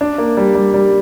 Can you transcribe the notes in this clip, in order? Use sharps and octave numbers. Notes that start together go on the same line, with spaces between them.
D4
A#3
G3
G3
G3